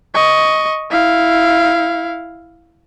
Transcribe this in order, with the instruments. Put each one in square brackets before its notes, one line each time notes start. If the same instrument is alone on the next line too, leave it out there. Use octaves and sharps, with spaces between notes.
[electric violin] D#5 C#6
E4 F5